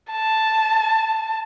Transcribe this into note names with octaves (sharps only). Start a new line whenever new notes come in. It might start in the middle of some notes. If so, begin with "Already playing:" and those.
A5